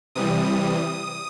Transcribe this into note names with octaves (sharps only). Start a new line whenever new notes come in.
C3 E3 G3 D#6